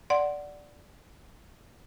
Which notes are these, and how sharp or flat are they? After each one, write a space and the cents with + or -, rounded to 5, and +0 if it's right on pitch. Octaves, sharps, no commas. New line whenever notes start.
D5 -5 F#5 +0 C6 +0